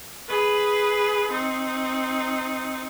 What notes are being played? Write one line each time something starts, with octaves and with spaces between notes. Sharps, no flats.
G#4 B4
C4 D#4